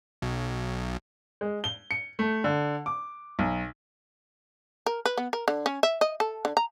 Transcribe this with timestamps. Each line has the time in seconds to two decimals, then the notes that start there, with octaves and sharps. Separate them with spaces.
0.22 B1
1.41 G#3
1.64 G7
1.91 C#7
2.19 A3
2.44 D3
2.86 D6
3.39 B1
4.86 A#4
5.05 B4
5.17 B3
5.33 A#4
5.48 D3
5.66 C#4
5.83 E5
6.01 D#5
6.20 A4
6.45 D3
6.57 A#5